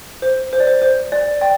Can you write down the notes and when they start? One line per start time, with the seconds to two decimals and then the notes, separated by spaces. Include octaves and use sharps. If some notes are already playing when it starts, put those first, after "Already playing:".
0.22 C5
0.53 C5
0.60 D5
0.67 C5
0.82 C5
1.12 D5
1.41 D5 G5